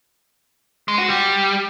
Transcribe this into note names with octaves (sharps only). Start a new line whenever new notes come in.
G#3
F#4
G3